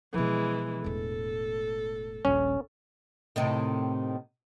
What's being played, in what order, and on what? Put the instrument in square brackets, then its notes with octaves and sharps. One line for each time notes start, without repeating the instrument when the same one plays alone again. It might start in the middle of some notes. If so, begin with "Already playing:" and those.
[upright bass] B2 F3 [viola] E3 G#3
[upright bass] E1 A2 [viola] A4
[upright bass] D#1 A#1 [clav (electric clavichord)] C#4
[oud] A2 C3 D#3